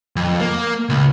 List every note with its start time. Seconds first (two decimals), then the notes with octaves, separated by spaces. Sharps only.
0.16 F2
0.41 A#3
0.89 C#2